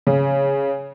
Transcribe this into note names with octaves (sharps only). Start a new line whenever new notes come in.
C#3